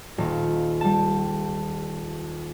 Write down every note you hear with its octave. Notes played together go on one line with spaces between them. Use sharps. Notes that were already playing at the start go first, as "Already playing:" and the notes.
D#1 F5
G3 A5